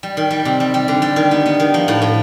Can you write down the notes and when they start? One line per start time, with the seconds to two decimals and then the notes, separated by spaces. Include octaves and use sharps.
0.03 G3
0.17 D#3
0.31 G3
0.45 C3
0.60 G3
0.74 G3
0.88 D3
1.02 G3
1.16 D#3
1.31 B3
1.46 B3
1.60 D#3
1.74 F3
1.88 A2
2.02 A2